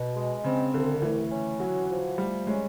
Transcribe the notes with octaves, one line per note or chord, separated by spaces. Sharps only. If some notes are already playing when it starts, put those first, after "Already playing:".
Already playing: B2
G#3
C#3 C4
C2 D3
E3 A3
C#4
F#3 F#4
F3
G3 A3
G#3 C#4